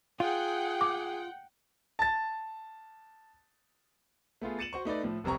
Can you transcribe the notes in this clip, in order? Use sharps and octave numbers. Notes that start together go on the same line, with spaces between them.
F4 G#4 F#5 G5
D6
A5 A6
A3 B3 F4 G#4
A6 C#7 D#7 E7 F#7
F#4 C5 C#6
A3 D#4 B4 D5
A2 F3 A3
F1 C2 C4 A#5 C#6